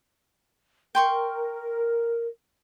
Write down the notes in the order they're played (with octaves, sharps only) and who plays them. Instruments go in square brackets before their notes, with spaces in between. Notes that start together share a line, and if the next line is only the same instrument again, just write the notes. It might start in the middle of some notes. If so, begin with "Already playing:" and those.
[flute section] A#4 [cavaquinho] G5 C6 C#6